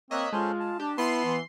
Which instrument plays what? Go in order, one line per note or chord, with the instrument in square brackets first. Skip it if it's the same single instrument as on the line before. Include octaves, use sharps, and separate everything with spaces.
[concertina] A#3 C#5 [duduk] C4 [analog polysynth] D#5 E5 F#6
[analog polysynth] G#3 [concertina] C#4 A4 C5 [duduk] F4
[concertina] A5
[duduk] D4 [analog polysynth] G4
[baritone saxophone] B3 [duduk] E4 [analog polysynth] C6 C7
[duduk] E3